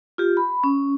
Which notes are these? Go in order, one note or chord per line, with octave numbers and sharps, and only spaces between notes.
F4 G4
B5
C#4